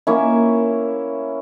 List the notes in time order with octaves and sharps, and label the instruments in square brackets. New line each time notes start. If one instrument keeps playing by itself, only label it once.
[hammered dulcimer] A#3 C#4 E4